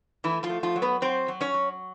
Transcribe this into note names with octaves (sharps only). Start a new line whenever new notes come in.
E3 A3 E4
F3 F4
A3
F3 F4
F#3
B3 B4
F#3 C4 C5
F#3
C#4 C#5
F#3